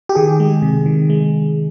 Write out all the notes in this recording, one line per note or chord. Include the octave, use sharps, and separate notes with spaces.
G4
D#3 G#4
G#3
C3
D#3
G#3